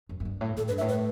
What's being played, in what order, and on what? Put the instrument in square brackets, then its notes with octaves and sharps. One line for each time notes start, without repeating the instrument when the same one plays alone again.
[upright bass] F#2
F#2
G2
A2
[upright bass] A2 [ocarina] A4
[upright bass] G2 [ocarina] B4
[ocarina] E5
[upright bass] A2
[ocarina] B4